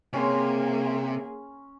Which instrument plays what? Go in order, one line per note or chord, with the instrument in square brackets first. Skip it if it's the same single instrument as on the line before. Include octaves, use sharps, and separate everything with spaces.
[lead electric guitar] C3 [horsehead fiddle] A#3 G#4 [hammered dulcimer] C#4 C6